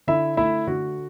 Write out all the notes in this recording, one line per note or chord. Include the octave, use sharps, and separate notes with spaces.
D3 E4 E5
A3 E4 E5
D3 F#4